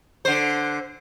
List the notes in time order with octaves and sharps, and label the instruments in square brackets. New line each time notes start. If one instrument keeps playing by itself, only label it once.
[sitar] D3 C5